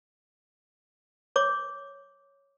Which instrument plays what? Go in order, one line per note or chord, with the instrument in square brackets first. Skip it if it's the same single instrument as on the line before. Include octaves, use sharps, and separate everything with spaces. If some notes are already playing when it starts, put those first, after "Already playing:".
[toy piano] C#5 D6